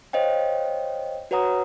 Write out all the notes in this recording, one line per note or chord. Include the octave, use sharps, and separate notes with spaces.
C5 C#5 D#5 F5 G5
F#4 B4 C#5 F#5 A#5 D#6